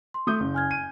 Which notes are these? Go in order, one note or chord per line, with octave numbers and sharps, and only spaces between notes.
C6
A3 D#6 G6
F#1
G#5 F6 G#6
D#7